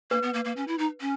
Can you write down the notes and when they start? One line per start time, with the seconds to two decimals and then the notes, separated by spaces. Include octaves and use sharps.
0.11 A#3 B4
0.22 B3
0.34 A#3
0.45 A#3
0.56 C#4
0.68 E4
0.78 D#4
1.01 C#4